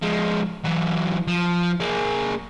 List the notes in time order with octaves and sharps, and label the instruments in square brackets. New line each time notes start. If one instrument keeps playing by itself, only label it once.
[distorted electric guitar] F3 G#3
E3 F#3
F3
A#3 G#4